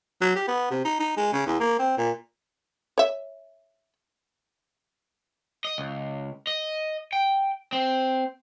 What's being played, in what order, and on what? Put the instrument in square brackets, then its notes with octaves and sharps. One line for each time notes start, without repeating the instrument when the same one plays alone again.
[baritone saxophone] F#3
G4
B3
C3
D#4
D#4
G#3
C#3
E2
A#3
C4
A#2
[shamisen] C#5 E5
[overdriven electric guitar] D#5
C#2
D#5
G5
C4